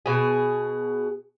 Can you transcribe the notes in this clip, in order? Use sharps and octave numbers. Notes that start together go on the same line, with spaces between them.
B2 G#4